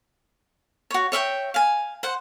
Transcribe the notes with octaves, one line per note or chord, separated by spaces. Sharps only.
F#4 C#5
C#5 E5 F5 G5
F5 G#5
C5 F#5